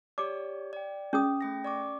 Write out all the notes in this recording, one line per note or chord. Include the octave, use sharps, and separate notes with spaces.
G4 C#5 D5 D6
D5 G5
C#4 G#4 D#6
A3 G5 A#6
D5 C#6 D6